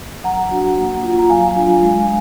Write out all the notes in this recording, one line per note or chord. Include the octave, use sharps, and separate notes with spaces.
F#3 F#5 A#5
D4 F#4
A#3
F4
A#5
F#3 F5 G#5
D4 F4
G#3